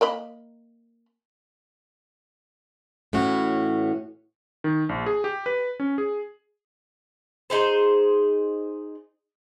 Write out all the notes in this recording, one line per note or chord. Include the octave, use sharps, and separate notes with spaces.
A#3 D#5 B5
A2 E3 C#4 F#4
D#3
A#1
G#4
G4
B4
C#4
G#4
D#4 G#4 C5